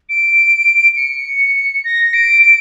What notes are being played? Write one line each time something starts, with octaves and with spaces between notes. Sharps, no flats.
D7
C#7
A#6
D7
D7